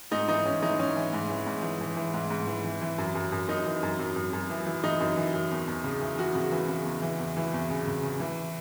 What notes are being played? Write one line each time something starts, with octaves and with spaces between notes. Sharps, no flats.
G#2 D#4
E3 D#4
E3 C#4
E3 D#4
E3 C#4
E3
G#2
E3
G#2
E3
E3
E3
G#2
G#2
E3
E3
E3
F#2
F#2
F#2
F#2 D#4
E3
F#2
F#2
F#2
F#2
E3
E3
E3 D#4
F#2
E3
F#2
E2
E2
C#3
E3
E3 F#4
C#3
E3
C#3
E2
E3
E2
E3
E2
C#3
C#3
C#3
E3